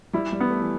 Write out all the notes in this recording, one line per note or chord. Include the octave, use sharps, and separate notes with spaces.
G3 E4
G3
B3
A3
E3